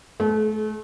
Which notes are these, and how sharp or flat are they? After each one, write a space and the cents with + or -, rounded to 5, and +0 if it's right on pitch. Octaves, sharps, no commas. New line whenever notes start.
A3 -35 G#4 +45